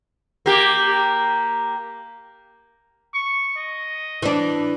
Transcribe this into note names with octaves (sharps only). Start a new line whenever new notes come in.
A#3 G4
C#6
D#5
E3 D4